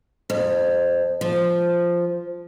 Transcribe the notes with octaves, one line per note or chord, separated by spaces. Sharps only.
F2
F3